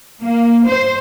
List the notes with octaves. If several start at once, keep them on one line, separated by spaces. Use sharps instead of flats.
A#3
C5